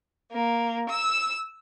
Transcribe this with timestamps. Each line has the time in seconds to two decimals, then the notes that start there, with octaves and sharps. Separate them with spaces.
0.31 A#3
0.90 E6